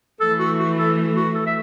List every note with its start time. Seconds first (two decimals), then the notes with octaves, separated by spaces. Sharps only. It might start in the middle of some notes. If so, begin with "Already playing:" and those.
0.21 E3 A3 A4
0.39 F#4
0.59 F#4
0.78 A4
1.16 F#4
1.35 A4
1.47 E5